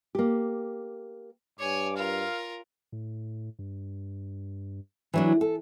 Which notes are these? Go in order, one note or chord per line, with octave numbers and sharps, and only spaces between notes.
A#3 G4
G2 C#5 G#5 D6
F4 A#4 F5
A2
G2
E3 F#3 D4
A4